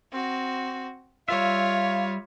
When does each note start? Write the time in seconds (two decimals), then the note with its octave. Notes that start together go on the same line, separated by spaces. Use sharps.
0.12 C4 F#4
1.29 G3 F4 C#5 E5 F5